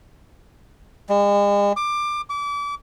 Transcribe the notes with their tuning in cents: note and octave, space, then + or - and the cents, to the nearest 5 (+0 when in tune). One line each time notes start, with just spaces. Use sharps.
G#3 -40
D6 +20
D6 -30